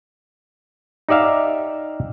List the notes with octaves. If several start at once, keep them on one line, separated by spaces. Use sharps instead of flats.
D#4 G4 D5 E5 F5